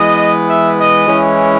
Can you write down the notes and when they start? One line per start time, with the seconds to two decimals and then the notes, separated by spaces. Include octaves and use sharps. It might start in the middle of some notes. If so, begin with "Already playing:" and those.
Already playing: E3 G#3 B3 D#5
0.49 E5
0.78 D#5
1.06 E3 G#3 C#4 E4